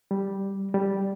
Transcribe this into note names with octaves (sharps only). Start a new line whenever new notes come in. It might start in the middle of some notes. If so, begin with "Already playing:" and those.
G3
G3